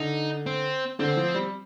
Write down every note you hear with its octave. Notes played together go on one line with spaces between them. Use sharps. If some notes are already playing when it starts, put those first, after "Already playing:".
Already playing: D3 D#4
C4
D3 C4
F3
G3